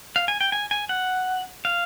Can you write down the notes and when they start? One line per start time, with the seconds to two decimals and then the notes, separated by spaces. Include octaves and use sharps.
0.16 F5
0.28 G#5
0.41 G5
0.52 G#5
0.71 G#5
0.89 F#5
1.65 F5